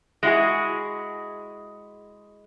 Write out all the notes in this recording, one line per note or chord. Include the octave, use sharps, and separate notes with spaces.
G#3 E4 F#4 G#4